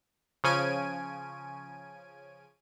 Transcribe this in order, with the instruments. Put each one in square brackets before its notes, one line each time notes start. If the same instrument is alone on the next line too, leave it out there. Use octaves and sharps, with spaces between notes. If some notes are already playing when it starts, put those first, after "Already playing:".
[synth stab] C#3 F3 C#4 G#5 D7 D#7